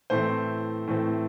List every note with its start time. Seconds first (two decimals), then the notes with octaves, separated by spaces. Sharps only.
0.10 A2 E3 A3 C4 C5
0.88 A2 E3 A3 C4